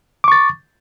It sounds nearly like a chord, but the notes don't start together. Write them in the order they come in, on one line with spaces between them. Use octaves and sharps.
D6 C#6 A6